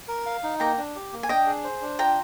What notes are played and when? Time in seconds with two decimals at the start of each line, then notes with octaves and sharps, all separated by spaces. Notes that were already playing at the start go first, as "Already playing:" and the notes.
0.08 A#4
0.26 F5
0.43 D#4
0.60 A#3 G5 A#5
0.78 D4
0.95 G4
1.13 A#3
1.23 G#5
1.29 D4 D#5 G5
1.47 G#4
1.64 C5
1.81 D4
1.99 F4 G5 A#5